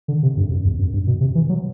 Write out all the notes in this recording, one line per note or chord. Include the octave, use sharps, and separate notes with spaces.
D3
C3
G2
F#2
E2
F#2
G2
B2
C3
E3
F#3